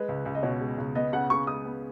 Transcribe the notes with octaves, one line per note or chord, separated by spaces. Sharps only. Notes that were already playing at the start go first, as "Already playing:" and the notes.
Already playing: G#3 B4
C#2
C#2
D#5
B2 C#5
G#3
C#2
B3 D#5
C#3 F#5
C#3 C#6
G#3 D#6
B3